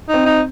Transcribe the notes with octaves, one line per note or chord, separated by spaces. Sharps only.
D#4
C4
D#4